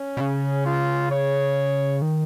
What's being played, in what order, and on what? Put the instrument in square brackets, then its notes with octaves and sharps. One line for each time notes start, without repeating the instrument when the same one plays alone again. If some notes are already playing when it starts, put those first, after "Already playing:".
Already playing: [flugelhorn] C#4
[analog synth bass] B2
C#3
[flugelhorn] F4
C#5
[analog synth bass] D#3